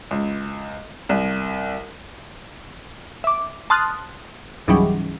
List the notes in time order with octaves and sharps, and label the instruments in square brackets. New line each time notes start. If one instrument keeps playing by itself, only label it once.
[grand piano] C#2
C2
[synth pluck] E5 D6
A5 C6 D#6 F6 F#6 A6
G#1 C#2 G#2 E3 F#3 G3